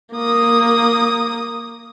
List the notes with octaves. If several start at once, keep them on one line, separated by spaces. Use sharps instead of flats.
A#3 D#6